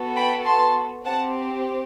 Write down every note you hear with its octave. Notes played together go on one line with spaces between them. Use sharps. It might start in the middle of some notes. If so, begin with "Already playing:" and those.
Already playing: B3 F#4 A4
G5 B5
A5 C6
C4 G4 F#5 A5